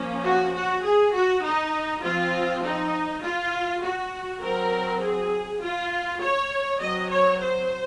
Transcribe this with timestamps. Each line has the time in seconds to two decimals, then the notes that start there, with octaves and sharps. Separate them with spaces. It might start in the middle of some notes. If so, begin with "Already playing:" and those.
Already playing: F3 A#3 C#4
0.23 F#4
0.53 F#4
0.83 G#4
1.13 F#4
1.42 D#4
2.02 F3 C4 F4
2.62 D#4
3.21 F4
3.81 F#4
4.41 F#3 C4 A#4
5.00 G#4
5.60 F4
6.20 C#5
6.79 F#3 C4 D#5
7.09 C#5
7.39 C5